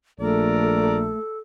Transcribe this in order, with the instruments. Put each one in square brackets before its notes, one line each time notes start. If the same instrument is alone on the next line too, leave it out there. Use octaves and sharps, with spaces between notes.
[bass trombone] A#1 [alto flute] A3 [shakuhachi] A4 [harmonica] A#4 D5